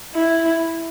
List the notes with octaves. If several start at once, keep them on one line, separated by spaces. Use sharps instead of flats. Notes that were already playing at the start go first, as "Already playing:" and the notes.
E4